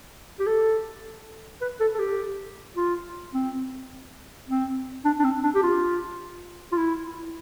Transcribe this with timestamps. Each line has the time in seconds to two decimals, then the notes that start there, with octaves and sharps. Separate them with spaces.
0.40 G4
0.47 A4
1.62 B4
1.80 A4
1.95 A4
1.99 G4
2.76 F4
3.34 C4
4.49 C4
5.05 D4
5.20 D4
5.24 C4
5.43 D4
5.55 G4
5.63 F4
6.72 F4
6.77 E4